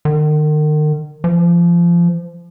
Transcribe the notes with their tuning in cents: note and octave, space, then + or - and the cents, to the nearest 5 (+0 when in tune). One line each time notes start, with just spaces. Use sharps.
D#3 -40
F3 -25